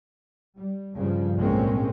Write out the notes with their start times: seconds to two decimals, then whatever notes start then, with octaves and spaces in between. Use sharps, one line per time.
0.55 G3
0.95 G2 C#3 F3
1.37 B1 A2 G#3 A#3 C4 C#4